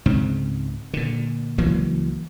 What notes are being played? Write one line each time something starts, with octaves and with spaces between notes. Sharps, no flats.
C#2 G#2 C4
A#2 D3
C#2 E3 F#3 A#3